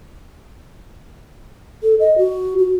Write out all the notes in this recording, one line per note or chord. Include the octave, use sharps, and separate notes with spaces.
A4
D#5
F#4
F#4